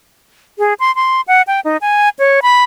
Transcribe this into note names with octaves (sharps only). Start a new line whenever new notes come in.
G#4
C6
C6
F#5
G5
D#4
G#5
C#5
B5